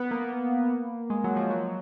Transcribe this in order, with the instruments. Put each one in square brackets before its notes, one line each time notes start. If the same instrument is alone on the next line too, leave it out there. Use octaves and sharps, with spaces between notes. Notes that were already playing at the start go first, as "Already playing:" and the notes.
Already playing: [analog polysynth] B3
A#3
G#3
F#3
F3
F#3